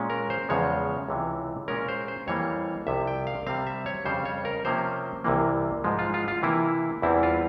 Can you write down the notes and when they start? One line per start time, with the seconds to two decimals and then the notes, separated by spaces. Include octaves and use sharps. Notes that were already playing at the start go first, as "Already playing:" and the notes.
Already playing: A#2 G#3 C#4
0.10 A#4
0.30 C5
0.49 E2 C#3 F3 G#3 C#5
1.09 C#2 C3 E3
1.68 A#2 G#3 C#4 A#4
1.88 C5
2.08 C5
2.27 F2 E3 G3 A#3 C#5
2.87 C2 C3 F3 E5
3.07 G5
3.27 F5
3.47 C3 G3 C4 F5
3.67 E5
3.86 C#5
4.05 F2 C#3 G3 C5
4.25 C#5
4.45 A#4
4.65 C3 F3 A#3 C#4 C5
5.24 C2 C3 E3 A#3
5.84 G#2 F3 G#3
5.99 F4
6.14 F4
6.28 F4
6.43 C3 E3 A#3 E4
7.02 E2 E3 G3 C4 E4
7.23 F4